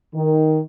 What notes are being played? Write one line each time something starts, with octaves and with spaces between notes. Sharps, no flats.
D#3